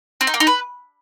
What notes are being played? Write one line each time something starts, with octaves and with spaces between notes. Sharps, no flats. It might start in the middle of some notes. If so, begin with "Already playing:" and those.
C4
D#4
A#3
D#4
B4